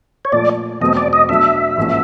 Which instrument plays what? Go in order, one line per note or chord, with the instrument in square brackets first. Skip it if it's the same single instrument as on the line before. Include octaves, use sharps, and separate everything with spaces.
[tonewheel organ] C#5
[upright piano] A#2 F3 A3 [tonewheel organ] D5
[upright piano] E2 B2 F#3 A3 C4 [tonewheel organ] D#5
[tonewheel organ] D5
D#5
[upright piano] B2 F#3 A3 D4 [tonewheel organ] E5
[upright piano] A1 G#2 F3 A#3 C#4